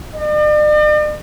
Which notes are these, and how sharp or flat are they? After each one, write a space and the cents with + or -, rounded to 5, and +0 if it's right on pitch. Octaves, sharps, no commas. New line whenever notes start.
D5 +45